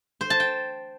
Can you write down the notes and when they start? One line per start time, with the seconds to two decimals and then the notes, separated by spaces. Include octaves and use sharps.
0.21 C5
0.30 A5
0.40 G5